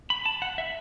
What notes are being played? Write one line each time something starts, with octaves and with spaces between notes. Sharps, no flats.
B5
A5
F#5
E5